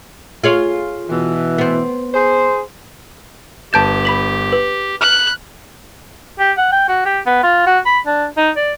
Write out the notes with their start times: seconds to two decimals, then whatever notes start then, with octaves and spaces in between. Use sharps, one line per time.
0.44 F4 G#4 C#5
1.09 B2 E3
1.58 B3 C4
2.14 G#4 C5
3.73 G1 G4 B4 A5 G6 A6 E7
4.05 B5 B6 F#7
4.52 B4
5.01 B5 F6 F#6
6.39 G4
6.57 F#5
6.72 G5
6.89 F#4
7.05 G4
7.26 B3
7.43 F4
7.66 F#4
7.86 B5
8.06 D4
8.37 D#4
8.56 D5